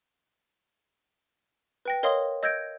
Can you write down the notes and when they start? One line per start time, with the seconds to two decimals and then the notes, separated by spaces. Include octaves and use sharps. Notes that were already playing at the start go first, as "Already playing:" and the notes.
1.85 B4 G5 A#6
2.03 A#4 C#5 D#5 F5 C6 D#6
2.43 D#5 E6 G6 G#6 A#6 D7